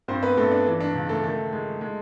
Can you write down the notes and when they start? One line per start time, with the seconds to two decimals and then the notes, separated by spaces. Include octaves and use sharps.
0.08 G2 C4 C5
0.23 B3 B4
0.37 G2 A3 A4
0.51 D4 D5
0.66 E3
0.80 D4 D5
0.95 C#2
1.09 A3 A4
1.24 D#3 A3 A4
1.53 G#3
1.81 G#3